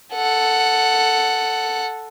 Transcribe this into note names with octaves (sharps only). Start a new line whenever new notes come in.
A4 F#5